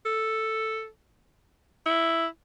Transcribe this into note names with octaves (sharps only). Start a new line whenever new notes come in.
A4
E4